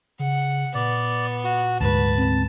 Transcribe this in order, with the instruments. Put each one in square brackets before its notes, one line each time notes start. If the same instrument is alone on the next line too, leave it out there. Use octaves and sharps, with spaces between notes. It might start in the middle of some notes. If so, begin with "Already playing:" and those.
[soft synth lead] C#3 [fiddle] F#5
[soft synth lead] A#2 [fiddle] B3 [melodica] D5
[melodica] F#4
[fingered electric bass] D2 G#2 [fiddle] B4 [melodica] A5
[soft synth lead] C4